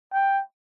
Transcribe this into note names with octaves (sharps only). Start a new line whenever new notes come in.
G5